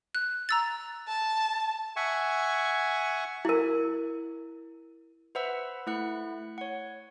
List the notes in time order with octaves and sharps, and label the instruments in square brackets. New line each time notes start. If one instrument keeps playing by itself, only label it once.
[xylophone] F#6
A#5 E6 A6
[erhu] A5
[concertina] E5 F#5 G#5 C#6
[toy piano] E4 A#4
[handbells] B4 C5 E5 F#5 B5 E6
A3 E4 F#5 F#6
C#5 F#5